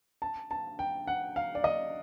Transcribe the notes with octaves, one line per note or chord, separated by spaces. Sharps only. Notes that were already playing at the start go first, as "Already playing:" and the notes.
A5
A5
G5
F#5
F5
D5
D#5